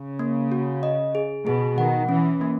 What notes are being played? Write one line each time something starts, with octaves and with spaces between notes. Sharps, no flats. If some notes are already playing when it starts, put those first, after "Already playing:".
Already playing: C#3
A#3
F#4
D#5
G#4
B2 G#4
D#3 F#5
E3 C#4
A#3